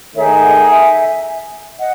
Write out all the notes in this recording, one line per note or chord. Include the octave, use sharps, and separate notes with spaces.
D#3 A3 D#4 G#4 C#5 E5
D#5 F#5
E5 G#5
D#5 F#5